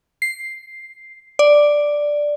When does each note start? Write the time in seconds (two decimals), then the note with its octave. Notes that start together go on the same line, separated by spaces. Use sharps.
0.22 C7
1.39 D5